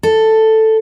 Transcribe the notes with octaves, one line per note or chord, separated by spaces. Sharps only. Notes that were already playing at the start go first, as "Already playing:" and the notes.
A4